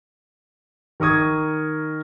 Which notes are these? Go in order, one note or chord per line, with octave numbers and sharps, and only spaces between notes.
D#3 A#4 C#6 D#6 G#6